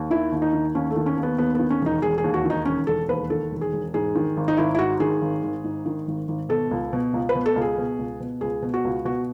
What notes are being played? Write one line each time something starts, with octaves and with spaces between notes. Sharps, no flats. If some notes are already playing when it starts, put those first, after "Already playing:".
Already playing: D#2
D#3 E4
D#2
D#4
D#3
D#2 C#4
A3
D#3
C#4
D#2
B3
D#2 B3
D#3 B3
C#4
E1 D#4
E1 G#4
G#4
D#2
F#4
D#3 D#4
E1 C#4
E1 A4
D#2 B4
D#3 A4
E1
G#4
E1
G#2 G#4
D#3
G#1
D#4
G#1 E4
E4
G#2 F#4
D#3 G#4
G#1
G#1
G#2
D#3
G#1
G#1
B2 A4
C#2
B2
C#2
B4
B2
A4
C#2
G#4
B2
C#2
B2
C#2 G#4
B2
F#4
C#2
B2 F#4